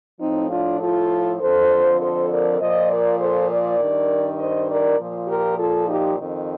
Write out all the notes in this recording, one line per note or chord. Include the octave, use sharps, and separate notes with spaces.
A2 F3 C4 D#4
D4 F4
F4 A4
F2 D3 F3 A4 C5
A4 C5
A#4 D5
A#2 F3 C5 D#5
A#4 D5
A4 C5
A#4 D5
G2 D#3
C5 D#5
A#4 D5
A#2 F3
G4 A#4
F4 A4
D#4 G4
F2 D#3